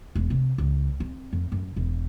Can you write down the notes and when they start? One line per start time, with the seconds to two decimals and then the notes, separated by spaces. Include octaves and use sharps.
0.15 E1
0.30 C3
0.58 C#2
1.00 C4
1.33 F2
1.52 F#2
1.76 E1